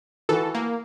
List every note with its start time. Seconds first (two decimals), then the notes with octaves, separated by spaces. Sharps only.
0.29 E3 F#4 A4
0.55 A#3